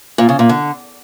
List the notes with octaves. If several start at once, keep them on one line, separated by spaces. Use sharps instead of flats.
A#2
C#3
A#2
D3